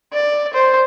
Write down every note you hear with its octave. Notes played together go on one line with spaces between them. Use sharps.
D5
C5